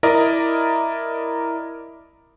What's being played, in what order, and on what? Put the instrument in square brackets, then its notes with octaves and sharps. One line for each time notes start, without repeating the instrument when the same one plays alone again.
[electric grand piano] E4 A#4 D5 D#5